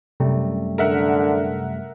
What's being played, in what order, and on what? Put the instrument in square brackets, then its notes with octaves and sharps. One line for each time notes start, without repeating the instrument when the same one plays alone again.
[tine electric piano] F#2 G3 A3 [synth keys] C3
[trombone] D3 [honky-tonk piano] A#4 E5 F#5